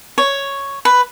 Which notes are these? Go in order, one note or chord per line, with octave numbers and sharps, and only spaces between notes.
C#5
B4